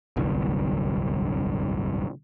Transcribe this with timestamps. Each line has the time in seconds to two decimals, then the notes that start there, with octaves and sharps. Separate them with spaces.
0.17 D1 G1 C2 G2